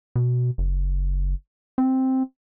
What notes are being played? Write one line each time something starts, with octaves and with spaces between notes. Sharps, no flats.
B2
F#1
C4